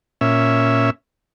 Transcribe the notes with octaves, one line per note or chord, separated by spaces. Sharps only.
A#2 C#4 E5